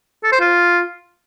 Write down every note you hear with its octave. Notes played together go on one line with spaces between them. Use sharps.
A4
C5
F4